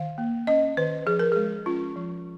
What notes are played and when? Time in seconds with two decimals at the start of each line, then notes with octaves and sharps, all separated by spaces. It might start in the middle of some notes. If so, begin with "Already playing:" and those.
Already playing: D#3 F5
0.18 A#3
0.47 C#4 D#5
0.77 D#3 B4
1.06 F3 G#4
1.19 A#4
1.32 G#3 G#4
1.66 C#4 F4
1.96 F3